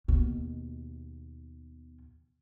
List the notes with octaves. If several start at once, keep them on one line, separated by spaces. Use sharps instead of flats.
D#2 B2